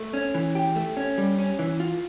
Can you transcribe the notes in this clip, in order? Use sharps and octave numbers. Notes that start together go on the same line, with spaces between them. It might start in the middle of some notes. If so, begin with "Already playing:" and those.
Already playing: A3
C#4
E3
G4
A3
C#4
G3
C#4
E3
F4